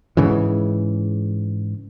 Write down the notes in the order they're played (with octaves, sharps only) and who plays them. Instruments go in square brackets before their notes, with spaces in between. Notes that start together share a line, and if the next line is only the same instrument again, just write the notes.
[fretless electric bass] G#2 C#3 E3